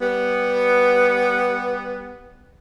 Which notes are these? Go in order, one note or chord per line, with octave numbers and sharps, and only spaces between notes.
G3 B3